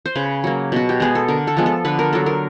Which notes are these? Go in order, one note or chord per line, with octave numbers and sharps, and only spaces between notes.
C5
C#3 B4
F#3 A#3
B2 F#4
G4
G#3 B3 G#4
A4
D3 A#4
A4
F3 G#3 B3
A4
D3 B4
A#4
F#3 B3 A4
A#4